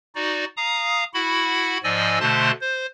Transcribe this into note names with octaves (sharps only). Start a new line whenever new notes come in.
D#4 F#4 D5
F5 A#5 D#6
E4 F#4 F#5 B5
G#2 F3 D5 D#5 G#5 E6
B2 D3 A3 C5 A5 C6
C5